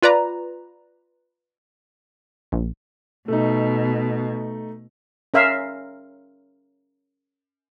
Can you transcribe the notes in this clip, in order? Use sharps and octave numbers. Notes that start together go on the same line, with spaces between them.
F4 B4 D5 A#5
A#1
B2 A3 D#4
C#4 A#4 E5 F5